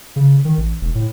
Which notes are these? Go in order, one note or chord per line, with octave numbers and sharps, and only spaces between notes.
C#3
D#3
A1
E1
A2